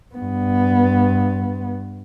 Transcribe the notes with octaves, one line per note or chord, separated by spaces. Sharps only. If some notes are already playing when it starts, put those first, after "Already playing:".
G2 B3